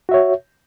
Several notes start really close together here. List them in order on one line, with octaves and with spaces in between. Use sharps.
F#4 E5 C#5